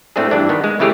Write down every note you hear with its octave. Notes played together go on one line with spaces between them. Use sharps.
A2 A3 C4 D4 G#4
G2 E3 D4
D#3 B3
G#3
C#3 E3 A3 G4 G#4 C#5